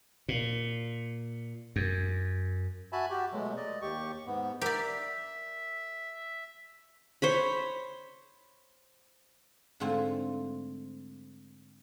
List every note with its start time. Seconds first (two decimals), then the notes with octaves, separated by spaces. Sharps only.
0.28 A#2
1.76 F#2
2.92 F#4 E5 G#5 A5 B5
3.10 F#4 G4
3.32 B2 F#3 G#3 A3
3.57 D5 D#5
3.81 D#2 G4 C#6
4.26 G#2 B3
4.61 G4 A#4 D5 E5
7.22 C5 C#5 B5
9.80 G#2 D3 A3 C4 F4 G#5